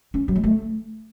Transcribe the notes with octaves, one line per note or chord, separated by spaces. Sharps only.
C#4
F#3
G#3
A3